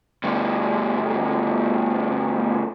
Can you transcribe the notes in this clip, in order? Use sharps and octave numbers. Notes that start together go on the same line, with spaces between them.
D2 G2